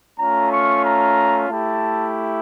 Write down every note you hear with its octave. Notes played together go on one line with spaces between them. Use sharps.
A3 C#4 F4 A#5
C#6
A#5
A3 E4 G4 A5